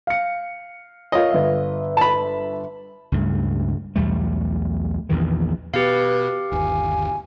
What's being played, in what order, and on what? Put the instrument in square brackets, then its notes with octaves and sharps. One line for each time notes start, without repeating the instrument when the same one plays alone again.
[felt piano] F5 C#7
[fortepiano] F4 D#5 [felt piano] A#4 C#5
[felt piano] G1 E5
[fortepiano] A5 B5
[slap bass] C#2 G2 A3
B1 E2 G3 A3
A#1 E2 D#3 E3
[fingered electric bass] B2 [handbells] G4 F5 [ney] B4
[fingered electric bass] G1 D#2 [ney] G#5